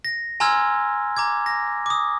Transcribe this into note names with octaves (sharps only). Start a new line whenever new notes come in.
A#6
G#5 A#5 C6 E6 F6 G#6
A#5 D6 G#6
A#6
D6 D#6